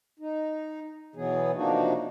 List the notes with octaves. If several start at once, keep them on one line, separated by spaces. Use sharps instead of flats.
D#4
B2 E3 F#3 B3 G#4
C3 F3 A#3 D4 D#4 F#4